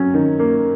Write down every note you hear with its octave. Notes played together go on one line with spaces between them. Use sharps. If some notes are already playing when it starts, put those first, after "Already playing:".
Already playing: F#3 C#4
D#3
A#3